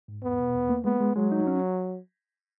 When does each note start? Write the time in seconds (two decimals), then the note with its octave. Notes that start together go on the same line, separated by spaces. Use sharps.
0.08 G#2
0.23 E2 B3
0.40 B2
0.55 E2
0.69 A#3
0.85 G#3 B3
1.00 G#3
1.16 F#3 G#3
1.32 D#4
1.47 C#4